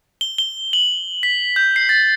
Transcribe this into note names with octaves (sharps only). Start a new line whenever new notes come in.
G7
G7
F#7
B6
G6
C7
A6